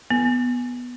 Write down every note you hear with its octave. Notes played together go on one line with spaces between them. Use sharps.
B3